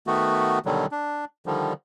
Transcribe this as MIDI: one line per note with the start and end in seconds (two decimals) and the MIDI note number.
0.07 0.59 51
0.07 0.59 57
0.07 0.59 59
0.07 0.59 66
0.66 0.86 47
0.66 0.86 50
0.66 0.86 51
0.66 0.86 54
0.66 0.86 55
0.92 1.25 62
1.46 1.73 50
1.46 1.73 51
1.46 1.73 53
1.46 1.73 55